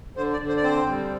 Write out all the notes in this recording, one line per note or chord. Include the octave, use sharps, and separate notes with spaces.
D3 C5
D5
D3
C5
D5
C4 C5
G3